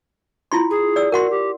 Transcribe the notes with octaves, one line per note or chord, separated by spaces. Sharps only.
E4 F4 C6
G#4
D5 E6
F#4 A#4 F#5 C6
G4